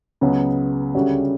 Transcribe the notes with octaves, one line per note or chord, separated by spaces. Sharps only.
C#2 C#3 F#3 B3
D2 C#3 G3 C#4 F#4